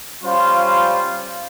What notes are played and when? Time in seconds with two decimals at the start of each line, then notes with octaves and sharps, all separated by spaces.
0.23 G3 C#4 F4 C5 F5